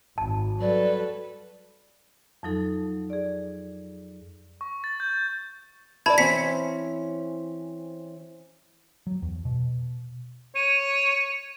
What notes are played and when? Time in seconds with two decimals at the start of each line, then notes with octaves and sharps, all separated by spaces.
0.18 G#1 A5
0.61 F#3 G3 A4 B4 D5
2.43 F2 F3 F#3 D#4 A4
3.10 G#4 D5
4.61 C#6
4.84 A6
5.00 G6
6.06 E4 C#5 D5 A5 B5 G#6
6.18 E3 C4 C#4 B6 C#7
9.07 F#3
9.22 E2
9.45 B2
10.55 C#5 D#7